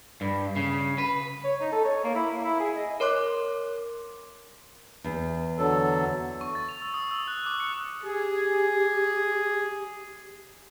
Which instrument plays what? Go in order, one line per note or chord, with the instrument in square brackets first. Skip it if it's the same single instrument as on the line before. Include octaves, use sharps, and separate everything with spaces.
[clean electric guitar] G2
C#3
B4
[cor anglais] C#5
D#4
A4
C#5
A#3
E4
A#3
E4
G#4
D#5
[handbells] A#4 C#5 C6 D6 F#6
[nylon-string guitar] E2
[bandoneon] D3 F#3 A4
[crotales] C#6
A6
F7
E6
D#6
E6
F#6
D6
C#7
[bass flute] G4 [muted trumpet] G#4